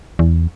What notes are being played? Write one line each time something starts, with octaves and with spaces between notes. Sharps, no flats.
E2